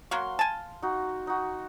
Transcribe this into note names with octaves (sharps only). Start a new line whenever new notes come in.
F#3 A#3 F#4 F5 C6
G#5 A5
D#4 F#4
D#4 F#4